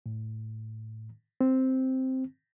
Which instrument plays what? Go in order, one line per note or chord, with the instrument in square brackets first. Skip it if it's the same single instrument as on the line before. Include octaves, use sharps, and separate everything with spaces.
[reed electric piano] A2
C4